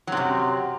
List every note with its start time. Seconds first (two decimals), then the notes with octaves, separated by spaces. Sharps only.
0.07 F#3
0.12 C3
0.17 F#2